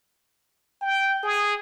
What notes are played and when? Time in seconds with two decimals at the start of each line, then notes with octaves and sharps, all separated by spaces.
0.82 G5
1.23 G#4